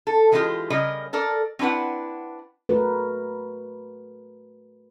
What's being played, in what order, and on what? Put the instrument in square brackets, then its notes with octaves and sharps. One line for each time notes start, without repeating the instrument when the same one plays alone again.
[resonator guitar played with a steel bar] A4
E3 F#3 G#3 D#4 F4 G4
C#3 G3 A#4 C#5 D#5
A4 A#4 D5
C4 D4 E4 B4 F#5
[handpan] A3 F#4 A#4 B4